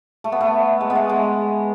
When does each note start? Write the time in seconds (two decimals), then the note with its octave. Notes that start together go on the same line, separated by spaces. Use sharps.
0.24 A3
0.32 B3
0.41 A3
0.81 G#3
0.90 B3
0.95 A3
1.09 G#3